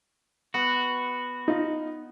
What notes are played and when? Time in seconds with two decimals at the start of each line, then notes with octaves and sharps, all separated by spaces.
0.54 B3 F#4
1.48 D#4 F4